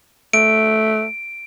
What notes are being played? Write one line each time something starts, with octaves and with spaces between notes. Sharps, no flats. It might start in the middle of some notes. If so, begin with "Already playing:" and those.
A3 D7